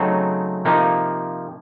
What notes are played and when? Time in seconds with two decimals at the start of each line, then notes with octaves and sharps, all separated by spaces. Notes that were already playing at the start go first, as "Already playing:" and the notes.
Already playing: C#3 F#3 A3 C4 D#4 A4
0.65 C3 F3 A#3 D#4